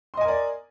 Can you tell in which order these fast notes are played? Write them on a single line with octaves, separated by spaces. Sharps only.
C6 D#5 G#5 A#4 D5